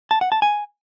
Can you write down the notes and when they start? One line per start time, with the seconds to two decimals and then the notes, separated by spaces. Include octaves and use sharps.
0.11 A5
0.21 F#5
0.32 A5
0.42 G#5